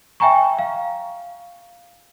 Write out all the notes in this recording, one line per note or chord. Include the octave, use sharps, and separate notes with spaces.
E5 G5 G#5 A#5 C#6
F5